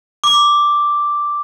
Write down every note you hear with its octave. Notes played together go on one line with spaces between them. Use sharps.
D6